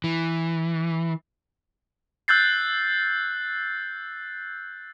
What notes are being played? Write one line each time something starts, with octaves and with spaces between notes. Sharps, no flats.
E3
E6 F#6 G6 A6 C7